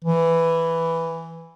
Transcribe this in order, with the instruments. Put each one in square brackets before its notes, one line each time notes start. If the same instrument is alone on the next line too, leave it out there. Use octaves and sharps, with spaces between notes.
[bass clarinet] E3